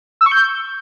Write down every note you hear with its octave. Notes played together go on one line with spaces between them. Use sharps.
E6
C#6
G6